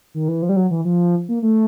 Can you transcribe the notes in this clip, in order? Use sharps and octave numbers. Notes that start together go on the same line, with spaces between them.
D#3
E3
F3
G3
F#3
E3
F3
A#3
A3